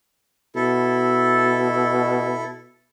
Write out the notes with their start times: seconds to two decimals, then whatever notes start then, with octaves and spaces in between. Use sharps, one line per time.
0.55 B2 E4 A4